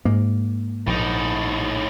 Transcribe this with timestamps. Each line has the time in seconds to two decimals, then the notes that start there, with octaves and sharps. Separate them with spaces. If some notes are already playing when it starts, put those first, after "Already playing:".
0.05 G#2 A#3
0.87 A#1 A2 D#4